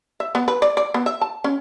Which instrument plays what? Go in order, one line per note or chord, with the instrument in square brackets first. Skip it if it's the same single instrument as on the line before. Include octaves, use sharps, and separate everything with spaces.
[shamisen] E5
B3
B4
D5
D5
B3
E5
A5
C#4